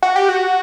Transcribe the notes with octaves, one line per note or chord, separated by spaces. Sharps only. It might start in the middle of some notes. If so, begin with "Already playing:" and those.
F#4
G4
F#4